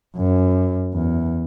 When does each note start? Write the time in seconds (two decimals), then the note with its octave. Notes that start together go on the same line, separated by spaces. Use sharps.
0.16 F#2
0.94 E2